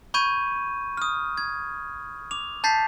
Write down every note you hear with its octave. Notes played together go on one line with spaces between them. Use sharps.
B5 C#6 G6 G#6 D#7
D#6 F6
G#6
D6 F7
A5 G6 A6 B6 C7